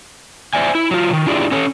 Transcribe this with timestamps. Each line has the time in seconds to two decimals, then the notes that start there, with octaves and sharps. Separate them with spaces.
0.54 C5 D5 E5 G#5
0.75 E4
0.91 F#3 F4
1.10 B2 D#3
1.26 D4 E4 F4 G4 G#4 D5
1.51 C#4 A4 C#5